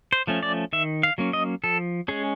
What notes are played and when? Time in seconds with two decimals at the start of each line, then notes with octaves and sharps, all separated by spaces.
0.13 C5
0.27 F3 A3 C#4
0.43 D5
0.73 D#3 E5
1.03 F5
1.18 F#3 A#3 C#4
1.33 D#5
1.64 F3 A4
2.08 G#3 C#4 G#4